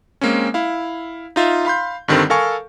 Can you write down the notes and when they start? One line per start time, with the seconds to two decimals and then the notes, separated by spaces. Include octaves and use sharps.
0.21 G#3 A#3 C4 C#4
0.54 E4 F5
1.36 D#4 F4 E5
1.65 F5 B5 C6 G6
2.08 G2 D3 D#3 G3 C4
2.30 A4 A#4 F5 G#5 C#6